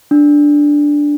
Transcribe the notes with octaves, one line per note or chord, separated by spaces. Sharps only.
D4